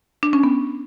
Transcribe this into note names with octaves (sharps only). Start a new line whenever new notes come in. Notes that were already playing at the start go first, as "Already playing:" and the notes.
D4
C#4
B3